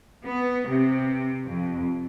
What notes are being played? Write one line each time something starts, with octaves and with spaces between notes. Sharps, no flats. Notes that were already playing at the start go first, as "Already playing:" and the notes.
B3
C3
F2